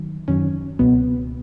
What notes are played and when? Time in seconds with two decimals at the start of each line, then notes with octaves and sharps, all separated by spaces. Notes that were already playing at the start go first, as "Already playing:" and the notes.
Already playing: D#3 F#3
0.28 F#2 D#3 F#3 C#4
0.79 C#2 B2 F#3 B3